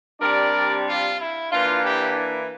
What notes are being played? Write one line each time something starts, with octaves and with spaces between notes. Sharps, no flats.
C3 G3 D4 A#4 D5
F4
E4
E3 A#3 D4 F4
E4 G4
E4